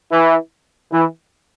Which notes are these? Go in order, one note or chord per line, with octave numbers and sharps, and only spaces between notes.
E3
E3